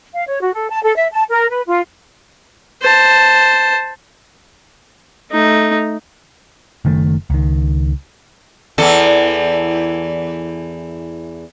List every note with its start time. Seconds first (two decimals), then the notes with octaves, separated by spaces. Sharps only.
0.14 F5
0.27 C#5
0.42 F#4
0.54 A4
0.71 A5
0.83 A4
0.96 E5
1.12 A5
1.28 A#4
1.50 B4
1.67 F4
2.82 C5 A5
5.31 A3 D#4
6.85 F#1 D#3 A3
7.30 C#2 D#3
8.78 E2 E3 A4